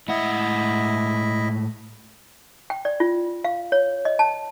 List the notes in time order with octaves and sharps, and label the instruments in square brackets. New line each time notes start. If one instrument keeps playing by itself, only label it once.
[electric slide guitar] A2 G#3 F#5 [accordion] E4 D#5 E5
[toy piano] G5
D5
F4
F5
C#5
D#5
A5